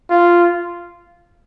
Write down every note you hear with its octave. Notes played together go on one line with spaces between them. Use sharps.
F4